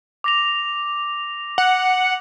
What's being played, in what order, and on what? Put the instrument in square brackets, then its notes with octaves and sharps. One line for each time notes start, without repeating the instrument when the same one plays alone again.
[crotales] D6 A#6 F7
[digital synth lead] F#5